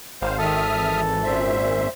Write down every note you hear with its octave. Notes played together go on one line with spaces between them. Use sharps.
G#1 C5 F5
D#3 A4 E5 D#6 F6
E3
F#2 A#2 C5 E5